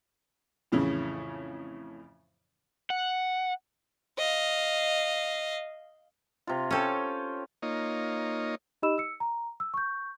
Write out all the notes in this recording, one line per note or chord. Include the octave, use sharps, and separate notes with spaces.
F2 A2 C#3 E3 C#4
F#5
D#5 F5
C3 F4
C#4 A4 C#5 G5
A#3 D#4 F4 C#5 D#5
D#4 G4 D#5 B5 E6 E7
E6 C#7
A#5
E6
C#6 G6